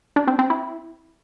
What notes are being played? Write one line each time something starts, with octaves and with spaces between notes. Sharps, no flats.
D4
C4
C4
E4